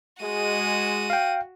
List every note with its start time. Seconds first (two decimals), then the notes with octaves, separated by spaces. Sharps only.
0.22 G#3 F#4 D#7
1.10 F5 G5